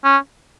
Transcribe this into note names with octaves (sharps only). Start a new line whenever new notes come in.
C#4